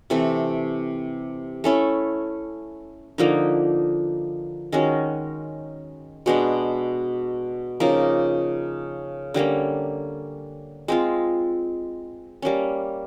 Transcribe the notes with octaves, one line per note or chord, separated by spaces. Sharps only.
C3 E3 A3 C4
A3 C#4 E4 A4
D3 F3 A#3 D#4
D#3 G#3 C#4 F#4
B2 G#3 B3 D4
C#3 F3 A#3 D#4
D3 G3 A#3 C#4
G#3 C4 F4
G3 A#3 C#4